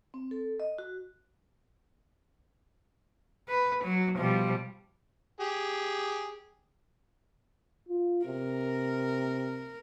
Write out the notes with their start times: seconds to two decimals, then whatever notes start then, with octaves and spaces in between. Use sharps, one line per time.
0.14 C4
0.31 A4
0.60 D#5
0.78 F#4
3.49 B4
3.84 F#3
4.17 B2 F3 G3
5.41 G4 G#4
7.89 F4
8.26 C3 A#4